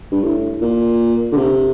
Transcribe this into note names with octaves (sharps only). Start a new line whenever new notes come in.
G2
A2
A#2
D3
C3